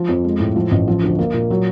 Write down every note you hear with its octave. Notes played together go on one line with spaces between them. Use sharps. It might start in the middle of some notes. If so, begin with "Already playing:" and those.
Already playing: F3
F2
G#3
A2
F3
A1
F3
D2
A#3
A#2
F#3